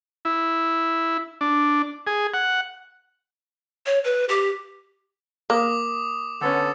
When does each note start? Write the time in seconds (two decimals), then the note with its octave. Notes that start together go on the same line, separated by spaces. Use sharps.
0.25 E4
1.41 D4
2.07 G#4
2.34 F#5
3.86 C#5
4.04 B4
4.29 G4
5.50 A#3 D6 D#6
6.41 D3 B3 C#4 A4